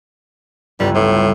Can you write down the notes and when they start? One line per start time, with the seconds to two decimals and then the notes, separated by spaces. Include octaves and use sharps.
0.80 G1 C#2 G3
0.95 A2